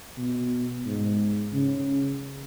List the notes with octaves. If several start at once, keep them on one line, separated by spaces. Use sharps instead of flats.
B2
G#2
C#3